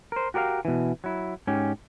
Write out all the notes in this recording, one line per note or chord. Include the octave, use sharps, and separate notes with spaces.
A#4 C5
F#4 G4 A#4 D5 F5
B2 E3
F#3 E4
G#2 C#4 G4